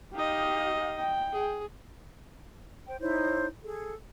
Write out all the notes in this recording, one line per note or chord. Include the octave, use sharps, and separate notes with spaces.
D#4 G4 D#5 F5
G5
G#4
C5 G5
D#4 E4 C5 C#5
G#4 A4